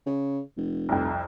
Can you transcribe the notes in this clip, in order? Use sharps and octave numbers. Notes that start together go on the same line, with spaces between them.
C#3
F1
C2 F2